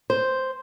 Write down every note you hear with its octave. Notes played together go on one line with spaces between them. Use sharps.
C5